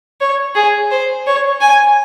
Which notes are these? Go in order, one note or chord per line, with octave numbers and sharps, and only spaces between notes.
C#5
G#4
C5
C#5
G#5